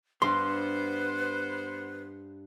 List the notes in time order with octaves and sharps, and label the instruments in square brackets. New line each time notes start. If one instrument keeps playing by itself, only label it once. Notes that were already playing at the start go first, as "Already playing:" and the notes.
[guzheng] G2 [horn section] B3 C5 [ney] B4 [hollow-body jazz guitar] C6